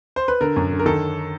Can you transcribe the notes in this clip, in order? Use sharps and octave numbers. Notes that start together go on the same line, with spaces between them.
C5
B4
D3 A#4
F#2
D3
A#4
D#3 A4